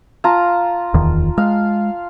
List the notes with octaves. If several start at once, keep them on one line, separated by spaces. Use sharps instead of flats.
F4 A5 A#5
D1 E2 D#3
G#3 F5